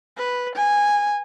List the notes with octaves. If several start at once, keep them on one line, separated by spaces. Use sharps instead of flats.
B4
G#5